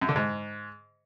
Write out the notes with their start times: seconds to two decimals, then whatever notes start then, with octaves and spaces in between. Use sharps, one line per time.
0.02 F#2
0.09 D3
0.16 G#2